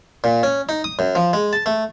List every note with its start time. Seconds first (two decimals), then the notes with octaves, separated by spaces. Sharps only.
0.24 A#2
0.43 C#4
0.69 D#4
0.84 D#6
0.99 F#2
1.15 F3
1.33 G#3
1.53 A5
1.66 A3